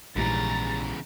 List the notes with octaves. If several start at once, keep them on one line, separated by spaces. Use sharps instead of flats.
A#1 E2 G#2 C#3 E3 G3 A#5 A6